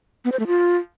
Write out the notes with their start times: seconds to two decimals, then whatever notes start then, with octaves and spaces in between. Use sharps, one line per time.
0.25 B3
0.32 C5
0.39 A3
0.47 F4